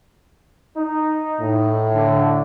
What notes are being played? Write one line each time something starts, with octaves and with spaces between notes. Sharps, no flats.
D#4
A2
D3